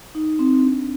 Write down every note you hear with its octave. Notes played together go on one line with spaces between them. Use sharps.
D#4
C4
D4